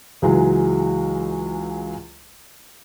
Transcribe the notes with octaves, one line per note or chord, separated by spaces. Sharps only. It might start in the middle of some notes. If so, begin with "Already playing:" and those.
C#2 E3 F#3 G#3